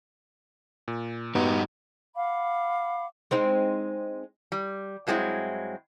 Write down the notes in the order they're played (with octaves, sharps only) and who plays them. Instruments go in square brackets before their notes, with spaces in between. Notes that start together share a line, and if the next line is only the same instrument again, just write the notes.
[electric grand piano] A#2
[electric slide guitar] G2 D#4 F#4 [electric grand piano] B3 G4
[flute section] F5 F#5 B5 D6
[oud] G#3 C4 D#4
[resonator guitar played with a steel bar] G3
G2 F#3 G#3 C4 E4